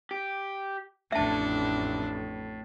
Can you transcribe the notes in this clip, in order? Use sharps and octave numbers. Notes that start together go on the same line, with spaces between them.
G4
A1 F2 A2 D4 E5 A5